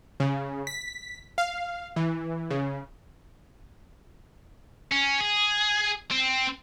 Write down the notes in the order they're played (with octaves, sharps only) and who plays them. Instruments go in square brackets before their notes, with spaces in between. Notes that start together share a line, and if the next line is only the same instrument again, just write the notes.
[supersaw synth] C#3
B6
F5
E3
C#3
[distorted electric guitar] C#4
G#4
C4